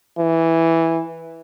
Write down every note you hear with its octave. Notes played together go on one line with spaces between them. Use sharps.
E3